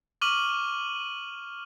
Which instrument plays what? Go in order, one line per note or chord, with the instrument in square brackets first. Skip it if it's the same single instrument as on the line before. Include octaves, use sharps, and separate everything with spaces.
[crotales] C#6 D6 F6 D#7 F#7 G7